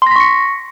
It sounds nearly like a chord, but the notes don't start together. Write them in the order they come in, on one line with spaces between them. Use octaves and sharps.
C6 A#6 B6 C#6 C#7